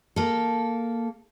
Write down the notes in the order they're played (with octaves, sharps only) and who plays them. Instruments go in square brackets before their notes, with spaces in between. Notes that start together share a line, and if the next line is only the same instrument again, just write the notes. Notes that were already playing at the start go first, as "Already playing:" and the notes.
[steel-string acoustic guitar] A#3 A4